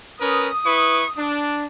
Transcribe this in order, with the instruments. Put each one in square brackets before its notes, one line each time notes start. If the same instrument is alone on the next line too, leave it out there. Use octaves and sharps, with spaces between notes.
[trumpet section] C#4 A#4 B4 [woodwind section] D#6
[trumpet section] E4 B4 C#6
D4